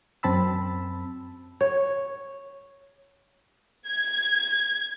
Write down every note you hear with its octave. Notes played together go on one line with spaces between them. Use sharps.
F#2 C4 A5 B5 E6
C#5
G#6